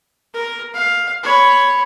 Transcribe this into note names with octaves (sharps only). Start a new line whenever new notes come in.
A#4
F5
C#5 B5